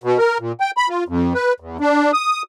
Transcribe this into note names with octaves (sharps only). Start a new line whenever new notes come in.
B2
A#4
A#2
G5
B5
F4
F2
B4
E2
D4
D#6